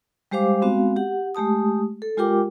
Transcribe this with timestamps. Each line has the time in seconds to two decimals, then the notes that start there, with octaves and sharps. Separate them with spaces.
0.31 G3 G#3 G4 C5 F5 D6
0.62 G#3 B3 C4 F#4 F5
0.96 G4 F#5
1.35 G#3 A3 G4 A5 D#6
2.02 A4
2.17 G#3 F4 G4 A#4 G5 D6